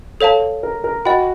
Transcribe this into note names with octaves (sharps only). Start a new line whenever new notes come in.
A4 C#5 F5 A5
A#4
A#4
F#4 D#5 G5 B5